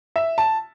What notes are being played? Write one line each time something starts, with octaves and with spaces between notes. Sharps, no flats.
E5
A5